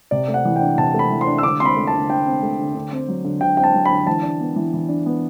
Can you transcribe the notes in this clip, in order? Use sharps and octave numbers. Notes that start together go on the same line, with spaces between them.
C3 D5
A3
F#5
E3
G5
D4
C3 A5
A3
B5
E3
C6
D4
E6
D3 D6
C4 C6
B5
A3
A5
D3
D3 G5
C4
A3
D3
D3
C4
F#3
D3
D3 G5
C4 G5
A5
F#3
B5
D3
E3 A5
D4
B3
E3
E3
D4
B3